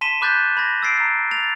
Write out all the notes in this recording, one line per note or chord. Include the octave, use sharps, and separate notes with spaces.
A5 C6 B6 D#7 E7 G7
B5 D6 F#6 G6 A6 B6
B5 G#6 A#6
E6 A6 C7 D7
A#5 C7
A6 F7